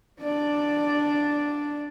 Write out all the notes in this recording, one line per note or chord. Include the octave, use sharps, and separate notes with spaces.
D4 D5